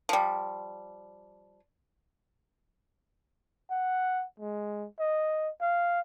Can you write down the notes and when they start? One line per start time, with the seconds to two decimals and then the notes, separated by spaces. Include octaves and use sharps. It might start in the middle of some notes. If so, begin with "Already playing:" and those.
0.09 F3 G3
3.71 F#5
4.40 G#3
4.99 D#5
5.61 F5